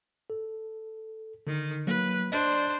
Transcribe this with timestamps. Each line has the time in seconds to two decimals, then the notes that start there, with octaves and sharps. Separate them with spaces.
0.30 A4
1.47 D3 D#3
1.87 F#3 A#3 B4
2.32 D4 C5 D5 D#5